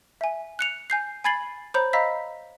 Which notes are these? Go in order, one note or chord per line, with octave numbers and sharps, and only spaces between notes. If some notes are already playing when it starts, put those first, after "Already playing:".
E5 G#5
F#6 C#7 F7
G#5 G6 C7
G#5 B5 G#6 A6 C7 F#7
C5 C#5 A#5 B5 G6
D#5 F5 A#5 B5 E6 B6